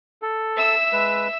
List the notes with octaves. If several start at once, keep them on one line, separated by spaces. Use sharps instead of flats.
A4
E5 E6
G#3 B4